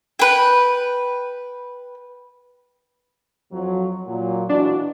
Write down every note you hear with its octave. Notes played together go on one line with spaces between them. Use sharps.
B4 G5
F2 F3 F#3
A#2 F#3
B2 E3 D4 F#4